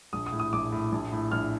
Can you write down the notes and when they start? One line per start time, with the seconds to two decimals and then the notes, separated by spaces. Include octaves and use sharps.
0.13 A#1 D#6
0.26 D#6
0.32 A2
0.40 D#6
0.53 A#1 D6
0.72 A2
0.92 A#1
1.12 A2
1.32 A#1 F6